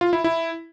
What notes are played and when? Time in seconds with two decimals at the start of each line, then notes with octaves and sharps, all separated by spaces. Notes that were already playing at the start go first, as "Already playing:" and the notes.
0.01 F4
0.13 E4
0.24 E4